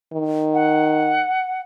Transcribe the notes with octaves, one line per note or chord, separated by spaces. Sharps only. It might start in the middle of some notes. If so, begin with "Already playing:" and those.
D#3
F#5